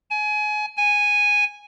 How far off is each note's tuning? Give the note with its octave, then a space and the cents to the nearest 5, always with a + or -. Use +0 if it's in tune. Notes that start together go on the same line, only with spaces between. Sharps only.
G#5 +25
G#5 -10